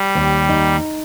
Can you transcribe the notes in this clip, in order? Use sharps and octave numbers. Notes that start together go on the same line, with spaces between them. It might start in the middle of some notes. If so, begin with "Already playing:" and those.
Already playing: G3
D#2
D#4